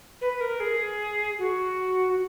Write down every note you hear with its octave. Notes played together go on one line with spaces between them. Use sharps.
B4
A#4
G#4
F#4